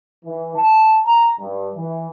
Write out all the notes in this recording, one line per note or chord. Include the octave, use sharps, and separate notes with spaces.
E3
A5
A#5
G2
E3